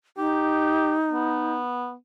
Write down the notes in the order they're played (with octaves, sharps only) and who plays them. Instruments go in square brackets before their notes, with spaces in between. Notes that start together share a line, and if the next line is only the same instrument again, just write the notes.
[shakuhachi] D#4 [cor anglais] G4
[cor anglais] B3